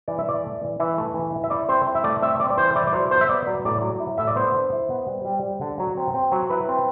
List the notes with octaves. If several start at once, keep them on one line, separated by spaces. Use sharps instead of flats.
E3 D5
E5
E3 D5
A3
E3
E3 E5
A3
E3
E4
E5
E4 D5
C4 C5
E4
E5
A3 D5
C4 E5
C4 D5
D5
E3 C5
E4 D5
D5
F#3 C5
B3 C5
E5
B3 D5
F#3 D5
A2 D5
F#3
E4
A2 E5
D5
B3 C5
D3
E4
B3
G3
G3
G3
D3
F#3
C4
C4
F#3
E4 B4
C4